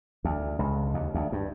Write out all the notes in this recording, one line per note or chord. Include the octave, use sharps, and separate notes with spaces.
D2
C#2
D#2
D2
G2